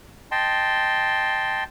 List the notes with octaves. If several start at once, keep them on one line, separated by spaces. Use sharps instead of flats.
D#5 G5 A5 C6